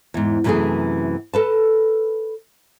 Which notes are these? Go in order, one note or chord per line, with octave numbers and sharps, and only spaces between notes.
E2 G#2
F#2 C3 E3 G3 A3 G#4
A4 B4 A5